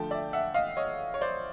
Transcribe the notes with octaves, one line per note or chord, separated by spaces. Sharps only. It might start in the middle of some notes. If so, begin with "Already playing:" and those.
Already playing: D3 F3 A3 G5 A5
D5 E5
E5 F#5
D#5 F5
C#5 D#5
C#5
C5 D5